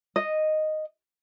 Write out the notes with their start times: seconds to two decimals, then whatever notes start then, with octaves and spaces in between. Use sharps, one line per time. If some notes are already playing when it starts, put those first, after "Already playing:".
0.16 D#5